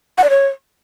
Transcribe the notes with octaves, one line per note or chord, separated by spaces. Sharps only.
F#5
D5
C#5